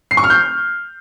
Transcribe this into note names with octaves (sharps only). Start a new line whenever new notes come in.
C7
C#6
F6
G6